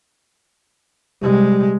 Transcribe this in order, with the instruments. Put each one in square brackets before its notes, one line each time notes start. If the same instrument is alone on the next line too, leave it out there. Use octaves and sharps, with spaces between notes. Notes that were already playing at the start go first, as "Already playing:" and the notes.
[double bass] C3 G#3 [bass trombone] G3